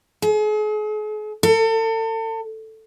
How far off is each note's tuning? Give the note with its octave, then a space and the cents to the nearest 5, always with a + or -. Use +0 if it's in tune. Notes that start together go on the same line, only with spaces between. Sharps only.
G#4 +40
A4 +35